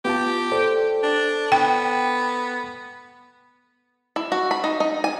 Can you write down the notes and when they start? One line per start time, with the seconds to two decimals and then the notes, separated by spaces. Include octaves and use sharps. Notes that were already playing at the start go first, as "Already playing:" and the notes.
0.05 B3 F4 G4 A5
0.52 A4 C5 D5
1.03 D4
1.52 B3 G5
4.16 E4
4.32 F#4
4.51 B5
4.64 D#4
4.80 D#4
5.04 G#5